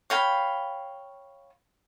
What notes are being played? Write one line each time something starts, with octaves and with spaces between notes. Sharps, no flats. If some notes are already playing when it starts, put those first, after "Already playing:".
C#5 F5 G5 B5